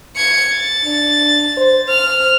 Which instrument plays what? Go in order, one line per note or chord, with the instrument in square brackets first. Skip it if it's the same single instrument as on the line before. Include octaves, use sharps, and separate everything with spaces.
[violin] G#6 C#7
A6
[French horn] D4
C5
[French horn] C5 [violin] F6